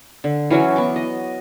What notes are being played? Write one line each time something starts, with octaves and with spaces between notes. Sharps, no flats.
D3
E3 F#3 C#4 F#4
B3 C#6 D6
D#5